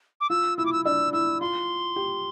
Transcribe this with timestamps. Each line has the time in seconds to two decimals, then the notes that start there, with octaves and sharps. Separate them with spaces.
0.21 D6
0.30 F4 E6
0.58 E4 E6
0.66 D6
0.73 E6
0.85 D4 E6
1.13 E4 E6
1.41 F4 C6
1.96 G4